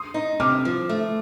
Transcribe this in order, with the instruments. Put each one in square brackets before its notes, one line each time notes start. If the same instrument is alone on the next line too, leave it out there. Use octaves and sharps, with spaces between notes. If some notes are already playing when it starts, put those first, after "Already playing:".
Already playing: [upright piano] C6 D#6
[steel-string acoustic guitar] D#4
[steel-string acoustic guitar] C3 [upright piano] D6 F6
[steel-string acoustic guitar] F3
A3